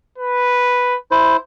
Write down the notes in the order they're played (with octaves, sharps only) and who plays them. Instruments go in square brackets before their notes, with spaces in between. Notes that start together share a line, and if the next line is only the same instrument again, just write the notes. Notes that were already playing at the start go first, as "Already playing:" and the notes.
[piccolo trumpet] B4
[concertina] E4 C5